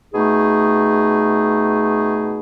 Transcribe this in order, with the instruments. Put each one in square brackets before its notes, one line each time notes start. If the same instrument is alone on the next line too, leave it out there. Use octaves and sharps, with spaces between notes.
[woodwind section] B2 A3 D#4 G#4